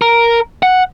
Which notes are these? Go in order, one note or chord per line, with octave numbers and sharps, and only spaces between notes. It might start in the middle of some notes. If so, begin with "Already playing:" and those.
A#4
F#5